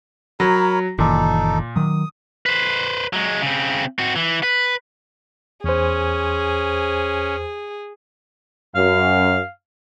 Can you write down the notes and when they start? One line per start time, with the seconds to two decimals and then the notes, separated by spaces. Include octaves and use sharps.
0.40 F#3 A#4 C#5 B5
0.99 F#1 A#2 D#3 E3 D#4 A4
1.76 D#3 F#3 D#6
2.46 B4 C5
3.13 F#3 G#3
3.42 C#3 C4
3.99 C4 F#4
4.16 E3
4.43 B4
5.64 E2 C#4 G#4 C5
8.75 F#2 F5